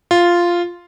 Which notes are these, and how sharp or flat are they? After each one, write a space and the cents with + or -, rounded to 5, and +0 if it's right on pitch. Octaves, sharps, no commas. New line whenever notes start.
F4 -5